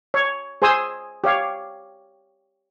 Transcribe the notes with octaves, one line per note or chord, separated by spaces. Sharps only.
C#5
G#4 C5 G#5 C6 D#6 E6
G4 C#5 F5